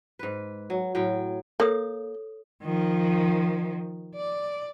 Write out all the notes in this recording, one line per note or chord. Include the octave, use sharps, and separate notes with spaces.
G#2 B4
F#3
A2 F#3 G5
A#3 A4 C#5 D#6
D#3 F3
D5